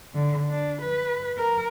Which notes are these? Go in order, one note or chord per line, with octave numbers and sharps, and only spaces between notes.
D3
D4
B4
A#4